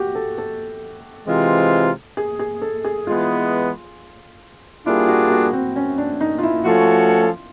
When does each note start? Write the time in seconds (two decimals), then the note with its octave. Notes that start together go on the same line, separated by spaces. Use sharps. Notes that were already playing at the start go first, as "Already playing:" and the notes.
Already playing: F#4 G4
0.15 A4
0.38 A4
1.27 C3 E3 G#3 C4 F4
2.17 G#4
2.39 G#4
2.62 A4
2.85 G#4
3.06 E3 G#3 B3 F4
4.86 G3 A#3 D4 E4 F4 G#4
5.08 F#4
5.31 F#4
5.53 C4
5.76 C#4
5.98 D4
6.21 D#4
6.38 F4
6.43 E4
6.65 F3 A3 C#4 F4 F#4 A4